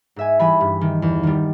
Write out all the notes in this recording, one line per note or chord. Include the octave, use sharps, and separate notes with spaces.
G#2 E5 G#5
E3 G3 G#5 B5
G2
D#3 G3
E2
D#3 G3